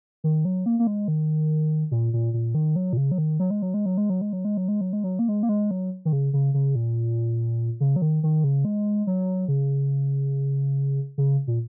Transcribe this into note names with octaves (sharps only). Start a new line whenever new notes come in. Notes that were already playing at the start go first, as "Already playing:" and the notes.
D#3
F#3
A#3
A#3
G#3
D#3
A#2
A#2
A#2
D#3
F#3
A#2
C#3
F#3
D#3
F#3
G#3
F#3
G#3
F#3
G#3
F#3
G#3
F#3
G#3
F#3
G#3
F#3
G#3
F#3
A#3
G#3
A#3
G#3
F#3
D#3
C#3
C#3
C#3
A#2
C#3
F#3
D#3
D#3
C#3
G#3
F#3
C#3
C#3
A#2